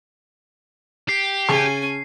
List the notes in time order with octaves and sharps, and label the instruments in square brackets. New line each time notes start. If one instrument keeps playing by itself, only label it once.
[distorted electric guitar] G4 [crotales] C7
[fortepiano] C#3 A5 C#6 [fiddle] C#4 G#5